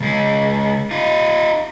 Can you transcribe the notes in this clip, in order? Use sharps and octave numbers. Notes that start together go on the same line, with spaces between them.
C#2 G#3
D#4 F4